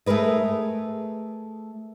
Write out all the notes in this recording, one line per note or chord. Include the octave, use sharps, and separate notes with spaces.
A3 G#4 A#4 B4 D#5